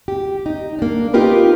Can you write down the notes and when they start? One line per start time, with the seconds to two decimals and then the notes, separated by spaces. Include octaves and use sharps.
0.08 G4
0.46 D#4
0.79 A#3 D4
1.14 C4 D#4 F4 G4 A#4 B4